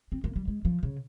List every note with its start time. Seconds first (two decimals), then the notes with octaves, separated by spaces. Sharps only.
0.12 C4
0.24 A#3
0.36 G3
0.48 G#3
0.65 F3
0.83 C#3